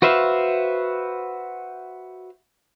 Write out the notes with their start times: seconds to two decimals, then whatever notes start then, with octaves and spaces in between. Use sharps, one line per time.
0.02 F#4 B4 C5 E5 F5